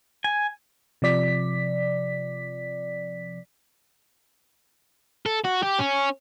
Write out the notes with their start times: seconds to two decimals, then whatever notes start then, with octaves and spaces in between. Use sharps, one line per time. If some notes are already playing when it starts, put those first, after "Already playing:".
0.24 G#5
1.02 C3 F3 D5 B6
5.26 A4
5.45 F#4
5.63 G4
5.79 C#4